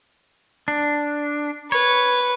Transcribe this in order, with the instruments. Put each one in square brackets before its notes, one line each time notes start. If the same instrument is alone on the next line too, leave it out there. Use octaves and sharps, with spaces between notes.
[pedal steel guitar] D4
[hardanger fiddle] B4 [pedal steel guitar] C#5